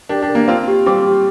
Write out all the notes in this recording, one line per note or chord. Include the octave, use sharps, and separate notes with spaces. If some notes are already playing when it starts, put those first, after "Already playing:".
D4 G4 A#4
D4 G4
A#4
A#3 D4
C4 F4 F5
G4
G3 C4 D6
G4